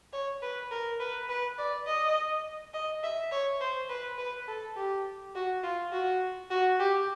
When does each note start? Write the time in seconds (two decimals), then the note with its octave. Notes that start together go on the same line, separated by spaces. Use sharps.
0.13 C#5
0.42 B4
0.71 A#4
1.00 B4
1.29 B4
1.58 D5
1.87 D#5
2.74 D#5
3.03 E5
3.31 C#5
3.61 C5
3.89 B4
4.18 B4
4.48 A4
4.76 G4
5.35 F#4
5.63 F4
5.92 F#4
6.51 F#4
6.79 G4